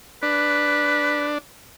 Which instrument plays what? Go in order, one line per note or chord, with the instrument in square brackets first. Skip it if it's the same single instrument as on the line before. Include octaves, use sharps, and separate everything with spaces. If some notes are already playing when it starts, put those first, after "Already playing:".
[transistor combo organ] D4 [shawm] B4